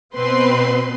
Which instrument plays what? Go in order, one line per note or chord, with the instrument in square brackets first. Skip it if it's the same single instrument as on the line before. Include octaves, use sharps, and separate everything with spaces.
[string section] B2 C4 B4 C6